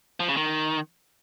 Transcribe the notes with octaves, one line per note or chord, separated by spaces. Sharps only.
F3
C#3
D#3